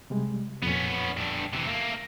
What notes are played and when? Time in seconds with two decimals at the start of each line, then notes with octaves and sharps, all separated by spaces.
0.10 C3 G3 G#3
0.62 F2 A#2 B3 C#4
1.17 G2 D3
1.53 C3 E3
1.67 A3 A#3